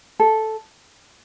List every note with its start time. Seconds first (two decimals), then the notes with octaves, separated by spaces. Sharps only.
0.20 A4